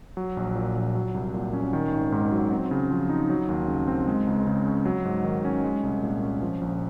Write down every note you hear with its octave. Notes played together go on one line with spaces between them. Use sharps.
F#3
A#1
A#2
A#1
F#3
C2
A#2
C#4
D#3
G#1
G#2
F#3
C4
C#3
F3
D#4
F#3
D#2
C#3
C4
G#3
C#2
C#3
C#4
F#3
G#2
D#3
C#4
G#3
C2
A#2
C#4
F3
A#1